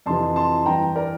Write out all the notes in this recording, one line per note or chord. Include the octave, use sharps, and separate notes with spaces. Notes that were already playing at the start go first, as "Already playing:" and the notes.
F2 C3 E3 A5 C6
A5 C6
G2 E3 G5 A#5
A#4 D5